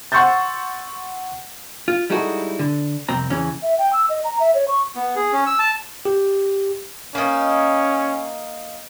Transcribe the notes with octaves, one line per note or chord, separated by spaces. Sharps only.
F#5 C6 C#6 E6 G6 A6
F4
G3 G#3 D#4 E4 F#4 A4
D3
C2 F2 C4 A#5
E2 C#3 E3 C#4
E5
G5
E6
D#5
A#5
E5
C#5
C#6
B3
G#4
C#4
E6
A5
G4
A#3 C#4 D#4